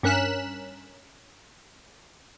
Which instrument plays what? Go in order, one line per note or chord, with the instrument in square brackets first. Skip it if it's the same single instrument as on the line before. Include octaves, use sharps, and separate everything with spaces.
[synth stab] G2 C#4 A#4 F#6 B6 E7